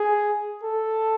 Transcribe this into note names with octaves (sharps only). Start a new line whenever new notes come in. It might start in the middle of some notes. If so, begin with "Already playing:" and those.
Already playing: G#4
A4